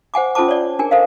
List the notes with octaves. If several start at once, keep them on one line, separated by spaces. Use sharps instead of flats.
C5 F#5 G#5 D6
C#4 F4 A4 C5 A5 D6
C#5 D5
D4 G#4 A#4 G#5
A4 A#4 C5 D#5 F5